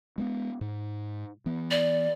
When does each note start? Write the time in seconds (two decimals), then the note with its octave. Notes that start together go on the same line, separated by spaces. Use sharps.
0.18 G#3 A#3 B3
0.61 G#2
1.46 E3 B3
1.71 D5